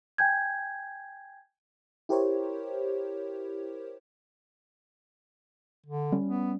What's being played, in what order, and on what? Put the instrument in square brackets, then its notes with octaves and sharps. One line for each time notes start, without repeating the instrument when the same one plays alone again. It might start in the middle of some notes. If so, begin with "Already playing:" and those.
[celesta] G5 G#5 G6 G#6
[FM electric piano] E4 G4 A#4 C5 C#5
[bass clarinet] D3
[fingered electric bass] G3 C#4
[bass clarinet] B3